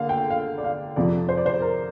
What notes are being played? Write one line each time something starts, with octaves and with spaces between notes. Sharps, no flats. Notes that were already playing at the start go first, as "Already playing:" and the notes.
Already playing: D3 A#3 F5
G5
F5
D5
F5
F2 C3 F3 D5
C5
D5
C5
A#4